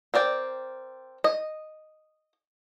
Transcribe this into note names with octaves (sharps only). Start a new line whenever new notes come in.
C4 A#4 D5 G5
D#5